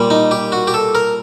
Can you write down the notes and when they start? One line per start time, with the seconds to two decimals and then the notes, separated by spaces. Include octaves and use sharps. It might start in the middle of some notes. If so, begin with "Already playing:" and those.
Already playing: A#2 G3
0.10 D#4
0.31 G4
0.52 F#4
0.67 G4
0.74 A4
0.95 A#4